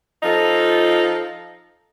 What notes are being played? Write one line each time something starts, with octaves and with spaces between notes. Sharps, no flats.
F3 D#4 F4 A4